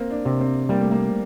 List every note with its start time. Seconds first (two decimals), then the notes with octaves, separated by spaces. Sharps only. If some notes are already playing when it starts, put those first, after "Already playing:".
Already playing: A#3 C4
0.11 D4
0.25 C3
0.40 C4
0.69 G3 A#3
0.81 A3
0.91 A#3